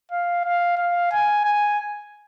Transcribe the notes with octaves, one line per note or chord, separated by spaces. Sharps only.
F5
F5
F5
G#5
G#5